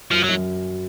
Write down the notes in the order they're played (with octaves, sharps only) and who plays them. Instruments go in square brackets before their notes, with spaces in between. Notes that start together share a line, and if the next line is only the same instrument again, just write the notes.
[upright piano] F#2 [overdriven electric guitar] F3
[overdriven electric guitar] F#3
[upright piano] F#2